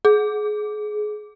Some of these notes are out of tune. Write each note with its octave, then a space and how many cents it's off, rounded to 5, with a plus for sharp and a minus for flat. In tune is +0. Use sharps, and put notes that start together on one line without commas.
G#4 +25